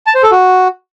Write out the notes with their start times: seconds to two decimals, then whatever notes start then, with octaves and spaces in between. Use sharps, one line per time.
0.07 A5
0.15 C5
0.23 A4
0.31 F#4